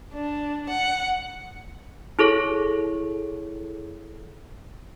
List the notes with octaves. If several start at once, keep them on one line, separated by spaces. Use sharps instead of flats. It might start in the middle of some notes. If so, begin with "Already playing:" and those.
D4
F#5
E4 G#4 A4 C#5